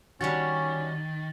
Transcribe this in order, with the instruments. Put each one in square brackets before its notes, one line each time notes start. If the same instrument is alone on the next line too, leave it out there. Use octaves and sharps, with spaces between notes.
[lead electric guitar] D#3 [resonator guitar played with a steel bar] G3 D4 F#4 [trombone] C#4 [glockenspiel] A6